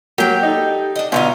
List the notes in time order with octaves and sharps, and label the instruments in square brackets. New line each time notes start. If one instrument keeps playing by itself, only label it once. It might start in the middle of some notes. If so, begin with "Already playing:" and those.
[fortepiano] F#3 A#3 [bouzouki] G4 G5
[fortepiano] D#4 A4
[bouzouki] D4 D#5
[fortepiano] B1 [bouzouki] D3 D#4 F4